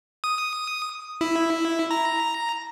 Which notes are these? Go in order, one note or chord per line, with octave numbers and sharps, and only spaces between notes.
D#6
E4
A#5